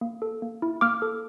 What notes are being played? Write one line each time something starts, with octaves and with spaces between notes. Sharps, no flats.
A#3
A4
A#3
E4
A#3 D6 F6
A4